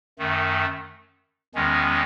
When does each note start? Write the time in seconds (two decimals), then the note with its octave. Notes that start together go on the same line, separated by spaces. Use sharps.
0.19 F#2 D#3 A3
1.55 E2 D#3 G#3 C#4